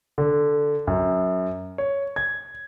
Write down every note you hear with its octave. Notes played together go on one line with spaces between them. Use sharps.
D3
F#2
C#5
G#6